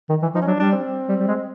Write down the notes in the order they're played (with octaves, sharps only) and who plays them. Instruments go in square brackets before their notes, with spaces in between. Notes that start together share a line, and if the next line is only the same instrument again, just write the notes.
[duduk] D#3
E3
[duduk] F3 [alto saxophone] D#4
[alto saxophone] C#4
[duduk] F#3 [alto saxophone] D4
[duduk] G3 [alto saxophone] D4
[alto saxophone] C4
[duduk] G3
G3
G#3